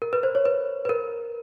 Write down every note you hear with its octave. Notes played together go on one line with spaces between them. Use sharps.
A#4
B4
C5
C#5
B4
B4
A#4